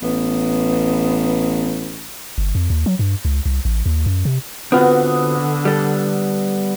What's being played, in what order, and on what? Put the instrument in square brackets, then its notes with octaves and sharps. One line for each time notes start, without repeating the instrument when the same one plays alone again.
[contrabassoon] A1 [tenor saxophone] B3
[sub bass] G1
F2
D#2
F#3
G2
C#2
C2
A1
D#2
F#2
C3
[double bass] D3 [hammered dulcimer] B3 [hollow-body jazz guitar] C4 F4 F#4
[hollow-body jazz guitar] G3 A4